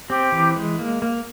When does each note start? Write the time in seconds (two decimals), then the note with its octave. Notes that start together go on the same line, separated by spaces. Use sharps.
0.09 C4 G4
0.32 E3
0.56 G#3
0.79 A#3
1.02 A#3